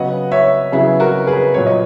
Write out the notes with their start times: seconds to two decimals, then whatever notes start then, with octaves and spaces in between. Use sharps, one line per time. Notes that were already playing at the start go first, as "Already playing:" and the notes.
Already playing: C#3 F#3 B3 D#5 F#5
0.32 C#5 E5
0.72 C#3 F#3 B3 E4 G#4
1.00 F#4 A#4
1.27 G#4 B4
1.54 A#2 F#3 B3 C#5
1.66 D#5